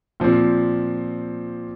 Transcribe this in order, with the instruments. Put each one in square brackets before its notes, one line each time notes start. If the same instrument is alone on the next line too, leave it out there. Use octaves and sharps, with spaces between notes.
[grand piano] A#2 F3 C4